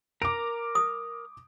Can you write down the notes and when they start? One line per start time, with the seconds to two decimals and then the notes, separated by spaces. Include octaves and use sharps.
0.22 A#4 A#5 D6 D7
0.75 D#6